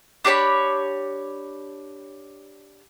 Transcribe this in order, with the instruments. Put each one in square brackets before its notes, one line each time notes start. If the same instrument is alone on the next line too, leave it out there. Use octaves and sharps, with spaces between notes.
[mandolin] D4 G4 C#5 B5